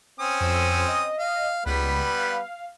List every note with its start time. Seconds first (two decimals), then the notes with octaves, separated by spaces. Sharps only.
0.20 C4 C#4 D#6
0.41 F2 C5 E6
0.88 D#5
1.18 F5
1.66 C#2 G3 B3 B4 B6
2.18 F5